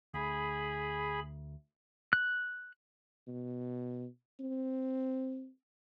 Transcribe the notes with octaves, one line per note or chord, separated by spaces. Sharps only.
D2 G#4 B5
F#6
B2
C4